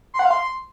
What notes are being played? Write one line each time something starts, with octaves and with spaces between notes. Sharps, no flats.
C6
F#5
F5
C6